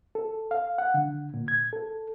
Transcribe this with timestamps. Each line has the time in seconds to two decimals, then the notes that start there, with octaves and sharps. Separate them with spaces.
0.15 A4
0.51 F5
0.78 F#5
0.94 D3
1.34 A#2
1.48 G#6
1.73 A4